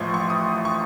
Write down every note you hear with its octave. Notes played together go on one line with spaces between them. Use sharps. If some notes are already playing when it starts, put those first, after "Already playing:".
Already playing: A1 A2 F3 C6 C#6
C#6
D#6
C#6